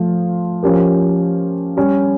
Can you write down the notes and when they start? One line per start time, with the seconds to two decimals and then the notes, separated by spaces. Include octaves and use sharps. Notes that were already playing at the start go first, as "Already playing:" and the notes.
Already playing: F3 A3 F4
0.63 F3 C#4 G4 A#4
1.77 G3 C#4 G4